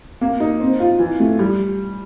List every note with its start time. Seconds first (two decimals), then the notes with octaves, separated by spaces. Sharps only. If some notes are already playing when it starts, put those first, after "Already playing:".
0.21 A#3
0.40 D#4
0.60 C4
0.80 F4
0.99 E3
1.20 A3
1.39 G3